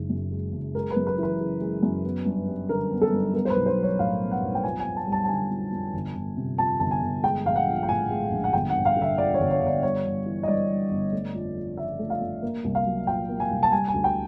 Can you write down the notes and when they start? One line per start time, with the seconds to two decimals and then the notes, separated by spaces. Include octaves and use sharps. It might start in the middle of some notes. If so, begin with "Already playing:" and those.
Already playing: F#1 D#3 G#3
0.10 F#2
0.31 G#3
0.53 F#1
0.75 G#3 A#4
0.90 B4
0.96 F#2
1.07 B4
1.18 E3 B4
1.40 C#3
1.61 G#3
1.83 F#2
2.05 B3
2.26 G2
2.48 G3
2.69 D3 A#4
2.91 B3
3.02 A4
3.12 G2
3.34 B3 A#4
3.45 C5
3.50 B4
3.56 B1
3.66 C5
3.78 F#3
3.83 C#5
3.99 A2 F5
4.20 B3
4.31 F#5
4.42 B1
4.55 G5
4.64 F2 G#5
4.80 G#5
4.85 F2
4.96 A5
5.07 G3
5.12 A5
5.24 A5
5.29 D3 G#5
5.50 F2
5.72 F2
5.94 G1
6.15 G1
6.37 C3
6.58 F2 A5
6.80 G1 A5
6.91 G#5
7.02 G1
7.23 G#3 G5
7.45 A#1 F5
7.56 F#5
7.67 F3
7.83 G5
7.88 A2 G#5
8.10 G#3
8.31 A#1
8.44 F#5
8.53 G1 G5
8.70 F#5
8.75 G1
8.85 F5
8.97 D3
9.02 E5
9.18 F2 D5
9.34 C#5
9.40 G1
9.50 C#5
9.61 G1
9.67 D5
9.83 G3 C#5
10.05 G1
10.26 E3
10.43 D#5
10.48 G2 D5
10.70 G3
10.91 G1
11.12 A3
11.35 F2
11.56 F3
11.77 C#3 E5
11.99 A3
12.10 F5
12.21 F2
12.42 A#3
12.64 C2
12.75 F5
12.86 F#3
13.07 A#2 G5
13.29 A#3
13.40 G#5
13.51 C2
13.63 A5
13.72 G3 G#5
13.88 G#5
13.94 D2
14.04 G5